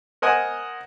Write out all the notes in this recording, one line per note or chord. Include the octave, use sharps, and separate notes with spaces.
A#4 C5 D#5 F#5 G#5